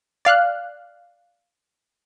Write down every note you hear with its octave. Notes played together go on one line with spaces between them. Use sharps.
D5 F5 F6 F#6